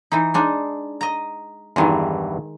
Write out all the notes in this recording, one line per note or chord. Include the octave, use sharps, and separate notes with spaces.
E3 D#4
G#3 D4 D#4
D#5 A#5
E2 G2 D#3 E3 G#3